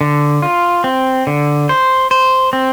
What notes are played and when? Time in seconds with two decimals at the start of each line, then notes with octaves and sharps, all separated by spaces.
0.01 D3
0.42 F4
0.84 C4
1.27 D3
1.69 C5
2.11 C5
2.53 C4